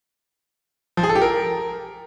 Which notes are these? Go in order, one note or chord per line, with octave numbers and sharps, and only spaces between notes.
F3
G#4
A4
G4
A#4